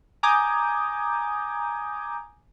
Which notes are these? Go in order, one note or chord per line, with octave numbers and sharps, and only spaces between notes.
G#5 A#5 D6 D#6 G6 G#6